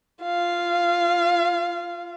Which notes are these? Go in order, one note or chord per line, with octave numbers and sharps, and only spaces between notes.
F4 F5